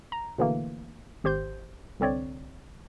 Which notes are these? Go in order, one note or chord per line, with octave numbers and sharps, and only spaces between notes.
A#5
B2 D3 E3 A3 A#3
G#1 G4 C5 C6 G6
C2 D3 C4 C#5 D5